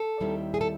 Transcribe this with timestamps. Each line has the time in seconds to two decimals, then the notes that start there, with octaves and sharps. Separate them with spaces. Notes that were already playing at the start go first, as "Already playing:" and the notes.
Already playing: A4
0.20 D#2 D#3 G3 C4 E4
0.54 G#4
0.61 A4